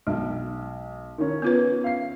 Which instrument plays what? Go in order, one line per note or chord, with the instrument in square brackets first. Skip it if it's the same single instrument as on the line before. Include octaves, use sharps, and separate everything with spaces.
[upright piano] B1 [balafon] G#3
[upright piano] D#3 C#4
[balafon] B3 F4 B4
[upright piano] F5 C7